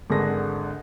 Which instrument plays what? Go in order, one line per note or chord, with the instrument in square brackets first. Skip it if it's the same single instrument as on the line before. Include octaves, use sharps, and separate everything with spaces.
[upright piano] G#1 D3 D4 G#4 A#4 A#6